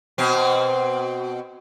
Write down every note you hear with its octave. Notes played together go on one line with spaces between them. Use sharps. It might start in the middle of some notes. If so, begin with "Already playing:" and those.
B2 C4